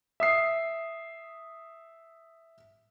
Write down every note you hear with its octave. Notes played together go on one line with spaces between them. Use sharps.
E5 D#6 C7